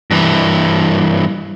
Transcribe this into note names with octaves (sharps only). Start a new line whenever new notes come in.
G2 E3